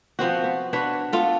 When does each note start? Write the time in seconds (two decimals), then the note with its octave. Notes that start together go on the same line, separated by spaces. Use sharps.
0.19 F3 B3 C4 F#4
0.44 B3
0.73 D4 F#4 B4 C#5
1.13 B3 F4 A4